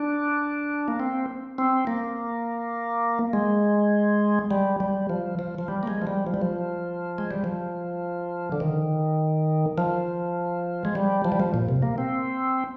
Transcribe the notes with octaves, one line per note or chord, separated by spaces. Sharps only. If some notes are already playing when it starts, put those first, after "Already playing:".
Already playing: D4
A#3
C4
C4
A#3
G#3
G3
G3
F3
F3
F3
G3
A#3
G#3
F3
G3
F3
G3
F3
G#3
G3
F3
D3
D#3
F3
G#3
G3
F3
G3
F3
A#2
C3
A#3
C4